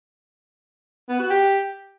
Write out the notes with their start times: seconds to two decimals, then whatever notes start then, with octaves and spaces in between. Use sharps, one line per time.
1.09 B3
1.19 F#4
1.30 G4